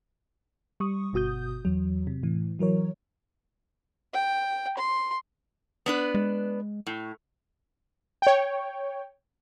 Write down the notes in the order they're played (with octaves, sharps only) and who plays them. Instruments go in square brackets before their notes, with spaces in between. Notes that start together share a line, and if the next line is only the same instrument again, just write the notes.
[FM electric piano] G3 C#6 D#6
G1 B2 F#4 D#6 G6
E2 F#3
C3
A2 E3
E3 F#3 A#4 C#5
[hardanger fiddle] G5
C6
[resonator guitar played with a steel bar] B3 D4 B4
[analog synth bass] G#3
[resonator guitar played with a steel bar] A2
[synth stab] C#5 G5